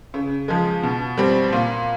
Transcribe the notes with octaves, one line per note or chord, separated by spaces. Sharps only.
C#3
F3 G#3
B2
G3 C4
A#2